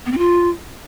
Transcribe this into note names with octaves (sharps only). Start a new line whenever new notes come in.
B3
C4
F4